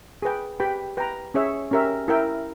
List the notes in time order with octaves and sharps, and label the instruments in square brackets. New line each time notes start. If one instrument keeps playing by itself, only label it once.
[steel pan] G#4 B4 G5
G4 B4 G5 B5
B4 G5 A#5
C#4 G#4 C#5 E5
C#4 G4 A#4 E5
E4 A#4 E5 G5